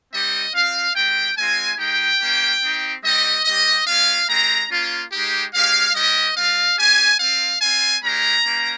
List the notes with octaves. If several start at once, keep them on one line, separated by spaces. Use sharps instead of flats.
G3 C4 D#4 G4 D#5
C4 F4 F5
G#3 C4 G4 G5
G#3 C4 F4 G#5
G#3 D#4 G4 G5
A#3 C#4 G4
C4 D#4 G4
G3 C4 D#4 G4 D#5
G3 C4 G4 D#5
G#3 C#4 F4 F5
G#3 C4 G4 A#5
A#3 C#4 F4
G#3 D#4 G4
G#3 C#4 G4 F5
G3 C#4 G4 D#5
G3 C4 F4 F5
C4 G4 G#5
C4 F4 F5
C4 F4 G#5
G#3 C#4 G4 A#5
A#3 C#4 G4